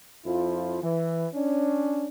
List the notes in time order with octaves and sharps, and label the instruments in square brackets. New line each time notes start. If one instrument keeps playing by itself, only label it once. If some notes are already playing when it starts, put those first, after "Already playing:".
[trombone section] F2 F3 E4 F4
E3
C#4 D4